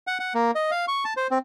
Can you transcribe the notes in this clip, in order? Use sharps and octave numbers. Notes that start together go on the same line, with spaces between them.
F#5
F#5
A#3
D#5
F5
C#6
A5
C5
C4